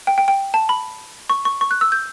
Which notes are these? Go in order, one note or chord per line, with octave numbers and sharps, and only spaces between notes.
G5
G5
G5
A5
B5
C#6
C#6
C#6
F#6
E6
G6